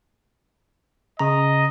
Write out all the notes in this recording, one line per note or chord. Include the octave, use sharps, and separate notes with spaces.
C#3 D#5 A#5